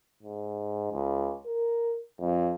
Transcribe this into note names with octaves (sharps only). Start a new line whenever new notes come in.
G#2
C#2
A#4
F2